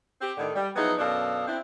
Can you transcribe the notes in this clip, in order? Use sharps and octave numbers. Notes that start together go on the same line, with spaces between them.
C4 G4
A2 D3 D#3
G3
F3 F#3 B3 D#4 E4 G#4
F#2 B2 D4 A4 D#5 F5
C4 D4 E4